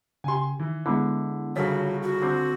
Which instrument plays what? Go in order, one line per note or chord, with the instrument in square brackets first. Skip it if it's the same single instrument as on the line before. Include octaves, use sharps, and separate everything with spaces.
[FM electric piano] C#3 G4 [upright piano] G#5 C6
[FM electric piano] D#3 [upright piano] E3
[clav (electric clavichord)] D3 [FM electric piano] G#3 B3 E4 [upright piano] B5
[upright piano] G1 C#3 B6 [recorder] F#4 [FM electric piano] A4 C#5
[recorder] F#4
[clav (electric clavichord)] D3 C4